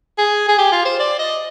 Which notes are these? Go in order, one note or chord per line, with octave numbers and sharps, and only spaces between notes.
G#4
G#4
G4
F4
C5
D5
D#5